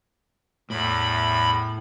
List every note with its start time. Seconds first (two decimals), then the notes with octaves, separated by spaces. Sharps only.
0.70 E2 A2 B5